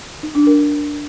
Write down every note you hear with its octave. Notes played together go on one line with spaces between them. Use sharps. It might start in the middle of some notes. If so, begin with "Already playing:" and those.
D#4
D4
A#4